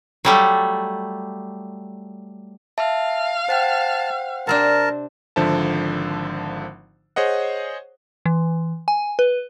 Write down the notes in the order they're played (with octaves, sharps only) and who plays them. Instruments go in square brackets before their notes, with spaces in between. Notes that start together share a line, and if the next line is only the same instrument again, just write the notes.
[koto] F#3 G3 A3
[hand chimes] E5 A5 [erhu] F5
[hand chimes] C5 F#5 G5 [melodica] A5
[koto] C3 C4 D4 [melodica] A#4 A5
[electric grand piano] G#1 D3 F3 C5 E5 A5
G#4 C5 C#5 D#5 F#5
[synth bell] E3
G#5
B4